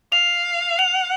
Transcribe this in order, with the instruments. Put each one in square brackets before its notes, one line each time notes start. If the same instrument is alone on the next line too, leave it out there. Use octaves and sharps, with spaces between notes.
[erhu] F5 [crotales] F7
[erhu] F#5 [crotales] F7